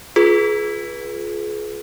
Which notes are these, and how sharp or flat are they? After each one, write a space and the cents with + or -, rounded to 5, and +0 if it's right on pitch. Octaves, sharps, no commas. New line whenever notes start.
F4 +0 G#4 +25 B4 -20